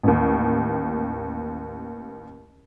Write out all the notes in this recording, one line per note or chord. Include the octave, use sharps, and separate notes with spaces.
A1 D#2